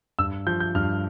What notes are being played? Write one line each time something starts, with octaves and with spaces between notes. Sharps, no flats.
G2 E6
F3 G6
G6
G2 F6